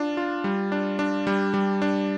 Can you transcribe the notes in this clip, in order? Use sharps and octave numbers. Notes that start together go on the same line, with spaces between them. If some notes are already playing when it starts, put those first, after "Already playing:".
Already playing: D4 F4
F4
G3
D4
D4
G3
G3
D4